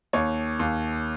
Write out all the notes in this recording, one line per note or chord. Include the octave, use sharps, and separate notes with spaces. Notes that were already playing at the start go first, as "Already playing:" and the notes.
D#2 C#5
D#2